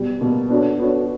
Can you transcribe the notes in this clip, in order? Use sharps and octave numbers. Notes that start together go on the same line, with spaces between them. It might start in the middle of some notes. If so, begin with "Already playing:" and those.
Already playing: B2 G3
B2 G3 A#3
B3 D4 F#4 A4 C#5
B3 D4 F#4 A4 C#5